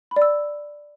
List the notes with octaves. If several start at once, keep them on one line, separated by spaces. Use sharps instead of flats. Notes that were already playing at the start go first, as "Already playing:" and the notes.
B5
D5
E6